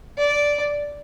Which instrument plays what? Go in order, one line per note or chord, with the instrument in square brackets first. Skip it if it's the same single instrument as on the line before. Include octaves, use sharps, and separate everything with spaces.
[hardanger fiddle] D5